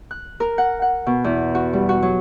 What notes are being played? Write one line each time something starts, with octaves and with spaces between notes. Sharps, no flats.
F#6
A#4
F#5
F#5
B2
E2
F#4
G3
F#4
F#3